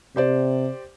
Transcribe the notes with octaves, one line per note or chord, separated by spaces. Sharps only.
C3 G4 C5 D5